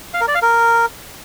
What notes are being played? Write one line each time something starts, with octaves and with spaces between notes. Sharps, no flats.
F5
A#4
D5
F5
A#4